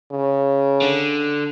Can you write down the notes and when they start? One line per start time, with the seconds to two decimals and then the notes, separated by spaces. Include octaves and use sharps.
0.12 C#3
0.82 D3